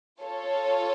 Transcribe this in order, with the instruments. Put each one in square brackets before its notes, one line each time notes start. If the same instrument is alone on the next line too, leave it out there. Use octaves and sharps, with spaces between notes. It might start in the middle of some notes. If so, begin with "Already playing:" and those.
[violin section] F4 A4 C#5